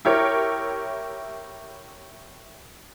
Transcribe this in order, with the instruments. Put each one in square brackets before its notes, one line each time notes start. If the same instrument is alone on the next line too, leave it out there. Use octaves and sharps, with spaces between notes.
[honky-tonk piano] E4 G4 A#4 C#5